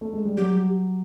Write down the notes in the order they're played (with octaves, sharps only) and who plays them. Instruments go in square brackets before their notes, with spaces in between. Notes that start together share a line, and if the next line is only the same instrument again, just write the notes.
[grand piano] A3
G#3
G3
[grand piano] F#3 [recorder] G4